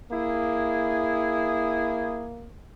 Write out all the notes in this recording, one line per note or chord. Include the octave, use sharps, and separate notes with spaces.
A#3 E4 G#4